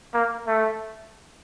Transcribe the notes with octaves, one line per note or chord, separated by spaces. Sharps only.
A#3
A3